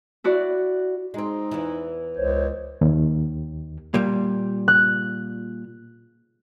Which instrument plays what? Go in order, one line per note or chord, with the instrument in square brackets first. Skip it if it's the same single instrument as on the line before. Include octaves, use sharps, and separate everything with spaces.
[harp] E4 F#4 D5
[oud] G#3 C4 [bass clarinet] D#4
[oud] E2 E3
[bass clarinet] C#2 [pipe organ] C5 C#5
[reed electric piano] D#2
[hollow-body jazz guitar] A#2 G3
[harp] F#6